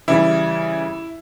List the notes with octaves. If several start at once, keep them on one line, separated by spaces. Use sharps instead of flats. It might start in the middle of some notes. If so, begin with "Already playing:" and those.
C#3 E3 G3 E4